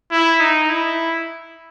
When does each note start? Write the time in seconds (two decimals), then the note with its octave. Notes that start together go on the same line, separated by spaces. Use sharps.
0.11 E4
0.40 D#4
0.70 E4